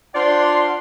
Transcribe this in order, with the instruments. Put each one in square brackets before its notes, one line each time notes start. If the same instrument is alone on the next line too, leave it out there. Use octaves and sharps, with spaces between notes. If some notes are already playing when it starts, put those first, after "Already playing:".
[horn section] D4 F4 C5 D5 F#5 C6